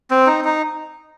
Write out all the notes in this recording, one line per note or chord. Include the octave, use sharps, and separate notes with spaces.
C4
D#4
D#4